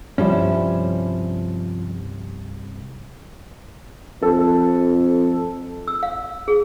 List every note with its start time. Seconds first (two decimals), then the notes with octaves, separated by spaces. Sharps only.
0.18 C2 G2 F3 G3 C#4 E4
4.22 F2 A4
5.88 E6
6.03 F5
6.48 G#4